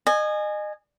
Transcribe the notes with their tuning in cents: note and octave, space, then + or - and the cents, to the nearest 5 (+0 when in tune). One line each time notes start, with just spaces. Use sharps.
D#5 -30 G#5 +0